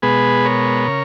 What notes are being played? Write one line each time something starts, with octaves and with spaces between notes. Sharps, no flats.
B2 G#3 B3 G#4 B4
A#4 C#5
C#3